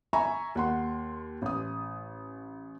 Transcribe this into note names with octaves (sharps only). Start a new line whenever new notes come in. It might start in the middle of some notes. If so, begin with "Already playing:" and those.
E5 G#5 A#5 B5 C#6
D#2 F#5 C6
A1 D#6